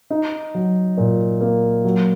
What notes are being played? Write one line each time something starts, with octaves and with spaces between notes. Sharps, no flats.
D#4
F#3
A#2
A#3
F#3